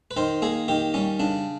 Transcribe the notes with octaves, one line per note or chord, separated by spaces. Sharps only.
B4
D#3 C5
A#3 G#4
D#3 G4
G3 C#4
C#3 D4